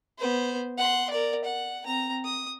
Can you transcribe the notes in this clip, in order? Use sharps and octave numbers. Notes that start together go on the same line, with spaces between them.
B3 C5
F#5 C6
A#4 D5
F#5
C4 A#5
D#6